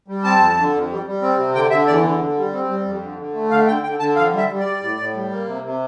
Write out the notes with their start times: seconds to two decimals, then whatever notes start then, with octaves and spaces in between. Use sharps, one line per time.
0.08 G3
0.24 C4 A5
0.40 F2
0.57 D3
0.73 F2
0.90 G3
1.06 G3
1.22 C4
1.38 C3
1.54 D3 G5
1.70 D3 E5
1.87 E2 D5
2.03 D3
2.20 D3
2.37 G3
2.53 C4
2.68 G3
2.85 F2
3.02 D3
3.18 D3
3.34 A3
3.50 D3 F5
3.67 D3 G5
3.83 D3 G5
3.99 D3 A5
4.15 F2 F5
4.32 G3 E5
4.49 G3
4.60 D5
4.65 G3
4.82 A2
4.98 A2
5.14 G3
5.31 A#3
5.47 C3
5.62 C3